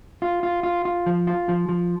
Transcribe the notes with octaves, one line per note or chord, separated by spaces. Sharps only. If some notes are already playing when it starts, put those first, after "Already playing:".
F4
F4
F4
F4
F3
F4
F3
F3